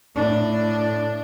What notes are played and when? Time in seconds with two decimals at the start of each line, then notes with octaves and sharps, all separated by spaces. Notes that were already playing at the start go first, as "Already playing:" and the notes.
0.15 A2 D4